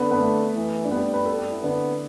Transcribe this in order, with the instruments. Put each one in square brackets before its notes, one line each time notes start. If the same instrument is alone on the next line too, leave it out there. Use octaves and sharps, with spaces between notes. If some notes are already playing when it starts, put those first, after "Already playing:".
Already playing: [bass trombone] D3 [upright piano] B3 B4
[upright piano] B3 B4
A3
[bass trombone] E3
[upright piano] D4
[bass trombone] G3 [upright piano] B3
[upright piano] B4
A4
G4
E4
[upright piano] D3 D4 [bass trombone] B3